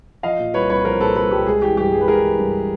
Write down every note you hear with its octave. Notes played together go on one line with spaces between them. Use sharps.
F3 D#5 F5
A#2
C2 B4 C#5
C2 B4 C#5
F3 A#4 C5
A#2 A4 B4
C2 A4 B4
C2 G4 A4
G#3 G#4
E3 G4
G2 G4
G2 G#4
B4
G#3 G#4 A#4
E3
G2